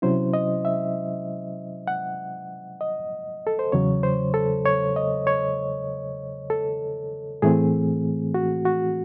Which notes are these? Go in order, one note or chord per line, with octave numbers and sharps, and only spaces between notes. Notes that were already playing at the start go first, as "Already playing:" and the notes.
C3 F#3 C#4 E4 C5
D#5
E5
F#5
D#5
A4
C5
E2 C#3 F#3 C#5
C5
A4
C#5
D#5
C#5
A4
A2 E3 A3 C4 G#4
F#4
F#4